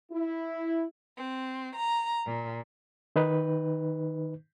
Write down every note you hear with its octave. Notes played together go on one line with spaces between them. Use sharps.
E4
C4
A#5
A#2
D#3 D#4 B4